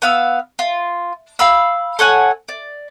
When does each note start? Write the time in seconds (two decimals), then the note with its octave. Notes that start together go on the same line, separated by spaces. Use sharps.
0.02 B3 F5 E6
0.59 F4
1.39 F5 B5 E6
1.99 A4 C#5 F#5 G#5
2.49 D5